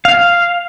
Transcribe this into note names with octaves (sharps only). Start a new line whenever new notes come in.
F5